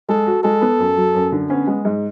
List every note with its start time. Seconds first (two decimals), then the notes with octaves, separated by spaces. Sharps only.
0.09 G#3 A4
0.27 F#4
0.44 G#3 A4
0.61 B3
0.79 F#2
0.97 F#3
1.14 F#2
1.32 D3
1.50 B3 C#4
1.67 G#3
1.85 G#2